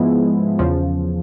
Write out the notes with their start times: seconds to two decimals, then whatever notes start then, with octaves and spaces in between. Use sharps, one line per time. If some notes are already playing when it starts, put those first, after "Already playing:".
Already playing: G#2 F3 G#3 B3 E4
0.59 E2 C#3 F3